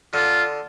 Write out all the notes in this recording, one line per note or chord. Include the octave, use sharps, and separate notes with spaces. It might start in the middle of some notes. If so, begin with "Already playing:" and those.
D3 F4